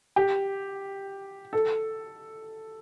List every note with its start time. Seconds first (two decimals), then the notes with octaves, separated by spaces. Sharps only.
0.16 G4
1.53 A4